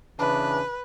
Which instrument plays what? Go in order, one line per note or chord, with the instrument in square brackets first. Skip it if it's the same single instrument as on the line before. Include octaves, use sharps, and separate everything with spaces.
[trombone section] C#3 E3 D4 [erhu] B4